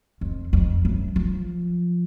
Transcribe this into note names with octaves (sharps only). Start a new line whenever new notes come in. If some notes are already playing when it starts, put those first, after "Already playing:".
F2
F2
F#2
F3